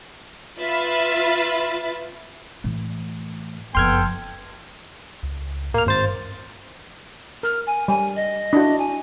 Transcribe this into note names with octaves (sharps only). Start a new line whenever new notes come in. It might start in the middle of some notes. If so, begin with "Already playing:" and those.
F4 B4 E5 B5 A6
A2 E3
F#1 F2 B3 A4 G5 C6 F6 G#6
C#2
A2 A#3 F6
G#1 G2 C5 A6
A#4 F6
G#5
G3 G#5
D#5
D4 E4 F#4
G#5